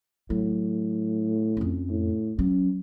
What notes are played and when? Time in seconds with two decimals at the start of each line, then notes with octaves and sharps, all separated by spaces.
0.30 A2 F#3
1.57 F2 C#4
1.90 A2
2.39 F#3 C#4